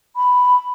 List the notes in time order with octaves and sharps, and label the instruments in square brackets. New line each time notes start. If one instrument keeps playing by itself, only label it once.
[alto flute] B5